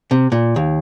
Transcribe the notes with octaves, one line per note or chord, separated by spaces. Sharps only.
C3
A#2
D#2